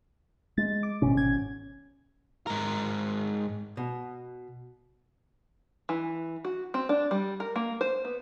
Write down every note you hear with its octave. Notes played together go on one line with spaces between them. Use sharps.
G#3 A6
D6
G#1 B2 C#4
G#6
G#2 A#4
B2
E3
F#4
C4
D4
G3
A#4
A#3
C5
B3